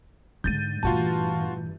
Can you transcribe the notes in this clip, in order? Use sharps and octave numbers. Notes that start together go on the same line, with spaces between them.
G#2 D3 G#3 G6 A6 D#7
G2 A#2 E3 A3 F4 F#4 A5